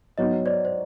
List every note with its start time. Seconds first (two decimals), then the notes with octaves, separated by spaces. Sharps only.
0.18 F#3 B3 D#4 C#5 D#5
0.46 C5 D5
0.65 C5